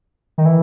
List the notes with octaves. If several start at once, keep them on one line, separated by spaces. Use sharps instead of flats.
D#3
E3